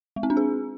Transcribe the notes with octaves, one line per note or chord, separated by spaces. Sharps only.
G#3
C4
D4
G#4